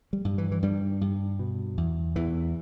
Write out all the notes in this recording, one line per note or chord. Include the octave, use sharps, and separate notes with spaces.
G3
G2
E3
E3
G2 G3
G2
B2
E2
E2 E3